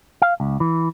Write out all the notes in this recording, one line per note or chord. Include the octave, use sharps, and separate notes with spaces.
F5
C#2
E3